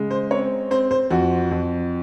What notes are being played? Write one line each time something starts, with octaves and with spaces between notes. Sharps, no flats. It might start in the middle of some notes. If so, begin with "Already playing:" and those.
Already playing: C#3 G#3
C5
C4 C#5
C4 C5
C5
F2 F#4
F2